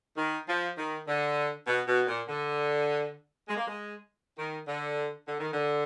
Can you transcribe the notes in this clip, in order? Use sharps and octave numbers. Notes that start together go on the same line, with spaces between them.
D#3
F3
D#3
D3
B2
B2
A#2
D3
G#3
A#3
G#3
D#3
D3
D3
D#3
D3